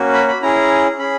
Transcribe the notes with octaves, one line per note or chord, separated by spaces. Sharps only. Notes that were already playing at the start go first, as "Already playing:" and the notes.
Already playing: A#3 C#4 F#4
B5
B5
C#4 E4 G#4 A#5
C#4 G#4 B5